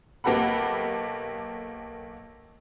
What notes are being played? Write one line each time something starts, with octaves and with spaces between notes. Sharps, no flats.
B1 A#3 G4 A4 F#5 B5